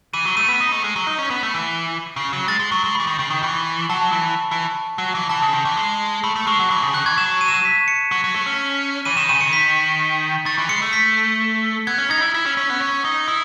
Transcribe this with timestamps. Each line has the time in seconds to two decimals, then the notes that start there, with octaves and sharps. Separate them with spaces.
0.13 E3 D#7
0.25 F#3
0.37 A3 D#7
0.48 B3
0.60 D#4
0.72 A3
0.84 G#3
0.96 F#3
1.07 D#4
1.19 C#4
1.30 B3
1.43 A3
1.54 E3
2.16 C#3
2.33 F#3
2.48 G#3 A6
2.60 G#3
2.72 F#3 C#6
2.84 G#3
2.95 E3 B5
3.07 D#3
3.18 C#3
3.30 D#3
3.43 E3
3.90 F#3 A5
4.12 E3
4.51 E3
4.98 F#3
5.15 E3
5.29 E3 A5
5.42 C#3
5.53 D#3
5.65 E3
5.77 G#3
6.23 A3 B5
6.36 A3
6.47 G#3 C#6
6.59 F#3
6.70 E3 B5
6.82 C#3
6.94 D#3 F#6
7.06 E3 G#6
7.17 F#3 E7
7.41 D#7
7.48 E7
7.55 D#7
7.65 B6
7.88 C#7
8.12 F#3
8.24 F#3
8.34 A3
8.46 C#4
9.05 E3 D#7
9.17 D#3 E7
9.29 C#3 D#7
9.41 D#3 C#7
9.53 B6
10.46 D#3 A6
10.58 E3
10.69 G#3 C#7
10.82 A3
10.93 B6
11.87 B3 G#6
11.98 C#4
12.10 D#4 G#6
12.22 E4
12.34 E4 E6
12.46 C#4
12.57 C#4
12.70 B3
12.81 C#4
13.05 D#4
13.28 E4 D#6